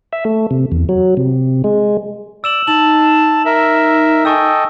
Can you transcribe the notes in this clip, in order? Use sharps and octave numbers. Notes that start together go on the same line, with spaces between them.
E5
A3
C3
E2
F#3
C3
G#3
D5 E6 E7 F#7
D#4 A5 E7 F#7
A#4 E5
A4 D#5 G5 G#5 C#6 E6